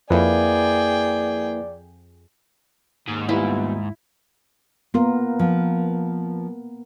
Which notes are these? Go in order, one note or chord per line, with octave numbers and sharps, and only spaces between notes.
F2 A#3 E4 G#4 B4 D5 G5
D#2 G#2
G3 B3 E4 F4
A#3 B3 F4 A#4
F3